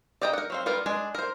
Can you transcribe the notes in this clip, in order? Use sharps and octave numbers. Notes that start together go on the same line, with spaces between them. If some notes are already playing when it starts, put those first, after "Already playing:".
D5 D#5 G5 A5 A#5
A#4 F#5
F#3 C4 F5
G3 B3 F4 A#4
G#3 D4 G#5
A#4 C5